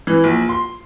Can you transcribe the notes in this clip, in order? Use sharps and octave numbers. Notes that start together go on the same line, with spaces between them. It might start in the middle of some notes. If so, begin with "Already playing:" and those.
E3
A#1
C6